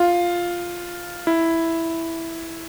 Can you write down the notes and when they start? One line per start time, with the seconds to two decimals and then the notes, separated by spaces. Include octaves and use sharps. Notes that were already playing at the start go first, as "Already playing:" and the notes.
Already playing: F4
1.27 E4